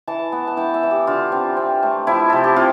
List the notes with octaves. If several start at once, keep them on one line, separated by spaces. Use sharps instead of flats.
E3 A5
B3
A5
E3 G5
E5
E3
G4
D3 F4
C4
C4
A3
F3 E4
C3 A4
G4
C4 F4